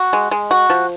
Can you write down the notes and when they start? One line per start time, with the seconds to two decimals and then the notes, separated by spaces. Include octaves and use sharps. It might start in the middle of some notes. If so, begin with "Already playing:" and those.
Already playing: F#4
0.13 G#3
0.31 G#3
0.51 F#4
0.70 F3